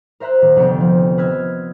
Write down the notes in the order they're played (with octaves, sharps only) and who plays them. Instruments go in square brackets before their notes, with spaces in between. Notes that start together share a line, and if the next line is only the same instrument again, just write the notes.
[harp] A#4 C5 E5 A#5 F#6
D#1
F1 D2 C3 B3 G4 G5
F3
B4 D#5 E6 F6 G#6